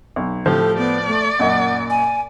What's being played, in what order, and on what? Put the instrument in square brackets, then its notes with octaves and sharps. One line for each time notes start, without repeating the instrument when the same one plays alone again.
[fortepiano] B1
[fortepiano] A2 F3 C5 [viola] G4 [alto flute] A4
[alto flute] B3 [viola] D5
[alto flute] A3
[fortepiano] F#2 A#2 D#5 [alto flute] F#5
[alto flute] G#5